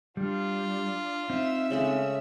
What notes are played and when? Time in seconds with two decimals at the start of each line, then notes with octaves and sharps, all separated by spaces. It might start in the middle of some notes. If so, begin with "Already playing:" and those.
0.17 G3 D4 F4
1.30 C4 D#4 E5 E6
1.70 C#3 G#3 A3